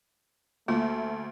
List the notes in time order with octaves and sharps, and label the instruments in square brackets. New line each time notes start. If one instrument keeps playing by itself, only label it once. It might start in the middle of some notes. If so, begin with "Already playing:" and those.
[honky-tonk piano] D2 [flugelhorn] A3 [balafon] A#3 F4